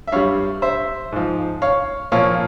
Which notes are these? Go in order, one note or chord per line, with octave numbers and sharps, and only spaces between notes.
E5
G2 G3 C#5 F5
C5 E5
G#2 F3
C#5 F5
A#2 F3 C#5 F5